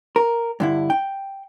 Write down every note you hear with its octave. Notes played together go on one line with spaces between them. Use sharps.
A#4
G2 D3 E4
G5